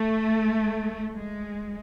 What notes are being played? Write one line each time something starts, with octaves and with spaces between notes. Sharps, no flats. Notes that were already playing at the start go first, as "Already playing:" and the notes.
Already playing: A3
G#3